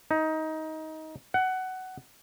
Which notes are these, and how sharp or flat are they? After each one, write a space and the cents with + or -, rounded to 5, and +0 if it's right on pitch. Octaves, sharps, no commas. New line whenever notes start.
D#4 +20
F#5 +15